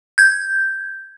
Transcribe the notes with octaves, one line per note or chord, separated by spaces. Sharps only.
G6 G#6